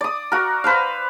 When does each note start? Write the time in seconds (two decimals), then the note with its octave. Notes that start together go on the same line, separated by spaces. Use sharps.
0.01 D5 D#6
0.32 F#4 A#4
0.64 B4 C5 F5